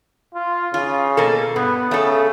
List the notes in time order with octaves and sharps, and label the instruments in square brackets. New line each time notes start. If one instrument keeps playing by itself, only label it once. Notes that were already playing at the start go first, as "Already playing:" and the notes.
[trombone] F4
[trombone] C#3 [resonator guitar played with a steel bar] F4
[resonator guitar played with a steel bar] B2 A#3 A4
[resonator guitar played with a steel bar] G2 [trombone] B3
[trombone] C#3 [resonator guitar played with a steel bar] A3 A4